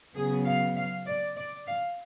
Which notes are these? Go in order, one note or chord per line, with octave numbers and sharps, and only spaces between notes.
C#3 F#3 B3 G#4
F5
F5
D5
D5
F5